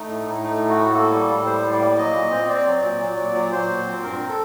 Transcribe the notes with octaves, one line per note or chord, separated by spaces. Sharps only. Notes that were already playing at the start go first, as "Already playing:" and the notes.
Already playing: A3 D#4
A2
A2
A3 D#4
A2
F#4
A2
A#3 A4
G3
A2
G3 C5
A2
D5
A#3
F#3 D#5
A#2
C4
C4 D5
F#3
A#2
F#3
A#2
F#3
F#3 C5
A#2
C4
G2 A#4
A4